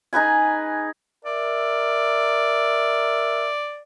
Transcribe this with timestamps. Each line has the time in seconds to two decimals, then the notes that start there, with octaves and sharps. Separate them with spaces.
0.13 D#4 G#4 B4 G#5
1.25 A#4 D5 E5